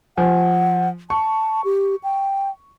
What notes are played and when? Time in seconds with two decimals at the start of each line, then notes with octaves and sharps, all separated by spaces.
0.17 F3 F#5 G#5
1.10 A5 C#6
1.65 G4
2.04 G5